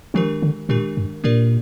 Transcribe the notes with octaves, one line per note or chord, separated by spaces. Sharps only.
D#3 F3 G#3 D4 G4 A#4
D3
A#2 D#3 G#3 D4 G4 A#4
G2
A#2 A#3 D4 G4 A#4 D5